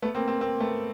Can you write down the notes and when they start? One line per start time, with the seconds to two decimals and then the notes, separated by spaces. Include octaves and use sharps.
0.02 A3 B3
0.15 A#3 C4
0.28 A#3 C4
0.41 A#3 C4
0.60 A3 B3